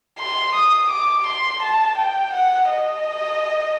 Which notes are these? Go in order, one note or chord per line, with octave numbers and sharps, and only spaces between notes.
C6
D#6
D6
C6
A5
G5
F#5
D#5